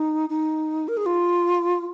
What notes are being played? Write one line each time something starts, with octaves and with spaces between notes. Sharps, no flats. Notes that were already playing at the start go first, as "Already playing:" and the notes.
Already playing: D#4
D#4
A#4
G#4
F4